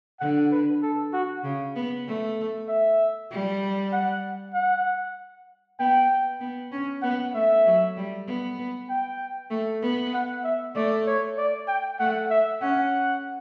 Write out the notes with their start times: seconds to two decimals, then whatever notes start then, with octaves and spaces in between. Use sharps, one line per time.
0.20 D3 F#5
0.52 B4
0.82 A4
1.13 F#4
1.44 C#3
1.76 B3
2.07 A3
2.69 E5
3.31 G3
3.93 F#5
4.55 F#5
5.79 B3 G5
6.40 B3
6.72 C#4
7.02 B3 F#5
7.34 A3 E5
7.65 F#3
7.97 G3
8.27 B3
8.90 G5
9.51 A3
9.82 B3
10.14 F#5
10.44 E5
10.75 A3 D5
11.07 C#5
11.38 D5
11.68 G5
11.99 A3 F#5
12.30 E5
12.61 C#4 F#5